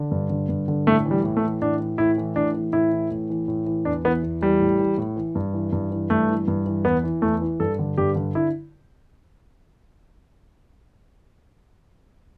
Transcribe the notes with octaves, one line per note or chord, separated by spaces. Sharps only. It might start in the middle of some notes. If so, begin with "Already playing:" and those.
Already playing: D3
G2
D3
G2
D3
A2 A3
E3
G3
A2
A3
E3
A2 D4
E3
A2 E4
E3
A2 D4
E3
A2 E4
E3
A2
E3
A2
E3
E2 D4
E3 B3
E2
E3 G3
A2
E3
A2
E3
G2
E3
G2
E3
G2 A3
E3
G2
E3
E2 B3
E3
E2 A3
E3
G2 A4
D3
G2 G4
D3
E4